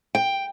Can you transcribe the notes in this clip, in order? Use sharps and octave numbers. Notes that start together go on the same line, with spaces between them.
G5